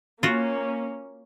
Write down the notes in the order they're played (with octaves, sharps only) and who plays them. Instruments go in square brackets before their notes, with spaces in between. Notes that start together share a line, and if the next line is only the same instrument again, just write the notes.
[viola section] A#3 C#4 [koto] F4 F#4